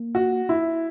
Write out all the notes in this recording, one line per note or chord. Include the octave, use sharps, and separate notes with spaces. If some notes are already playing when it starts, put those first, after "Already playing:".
Already playing: A#3
F#4
E4